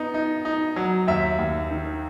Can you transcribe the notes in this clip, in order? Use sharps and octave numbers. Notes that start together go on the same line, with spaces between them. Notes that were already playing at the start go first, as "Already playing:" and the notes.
Already playing: B3 D#4
D#4
D#4
F#3
D#2 E5
D#2
D#3